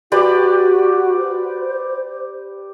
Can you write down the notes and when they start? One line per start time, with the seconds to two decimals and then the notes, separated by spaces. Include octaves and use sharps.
0.12 F#4 G4 B4 D5
1.19 C5